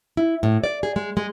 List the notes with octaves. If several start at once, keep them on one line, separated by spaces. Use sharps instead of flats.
E4
A2
D5
G#4
G#3
G#3